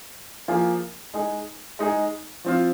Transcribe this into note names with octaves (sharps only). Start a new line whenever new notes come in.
F3 A#3 F4 G#4
G#3 D#4 G#4
G#3 D#4 G#4
F3 C4 F4